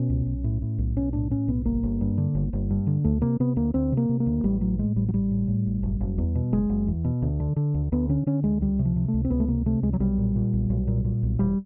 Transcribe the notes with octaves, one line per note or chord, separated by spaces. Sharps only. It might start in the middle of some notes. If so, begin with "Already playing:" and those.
Already playing: B2 C#4
C#2
B1
A2
A2
B1
B1 C#4
A2 D4
A2 C#4
B1 B3
G1 A#3
G1
G2
D3
G1
G1
G2
D3
D2 A3
C3 A#3
C3 B3
D2 A#3
D2 C4
C3 A#3
C3
A#3
D2
A1 G3
A2 F#3
A2 G#3
A1 G3
F#3
A1 G3
A2
A2
A1
F#1
F#1
E2
B2
F#1 G#3
F#1
E2
B2
D2
D3
D3
D2
D2 B3
D3 C#4
D3 C#4
D2 G#3
C#2 G3
C3
F3
C3
A3
C#2
C4
C#2 B3
A3
C3 A#3
C3 A3
C#2 G#3
F#3
B1 G3
A#2
A#2
B1
B1
A#2
A#2
B1
E1 G3